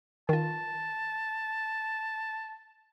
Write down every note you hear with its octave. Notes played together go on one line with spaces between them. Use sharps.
D#3 F4 A5